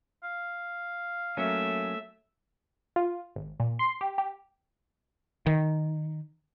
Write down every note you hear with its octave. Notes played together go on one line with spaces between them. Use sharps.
F5
F#3 A3 A#3 C#4 E5
F4
G#1
A#2
C6
G4
G4
D#3